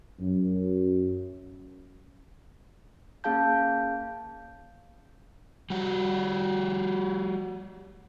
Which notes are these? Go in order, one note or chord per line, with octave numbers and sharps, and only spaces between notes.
F#2
A#3 C#4 G#4 F5 A5 G6
G3 F#4